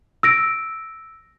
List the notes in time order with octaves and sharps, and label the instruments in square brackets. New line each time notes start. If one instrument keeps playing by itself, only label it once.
[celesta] E6 A#6 D7